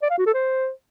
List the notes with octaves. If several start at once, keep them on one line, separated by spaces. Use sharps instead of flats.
D5
F5
F#4
A4
C5